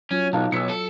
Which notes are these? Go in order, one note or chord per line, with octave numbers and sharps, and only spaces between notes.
F#3 C#4 F4
B1 D#4 F5 A5
B1 E6 B6 C#7
A4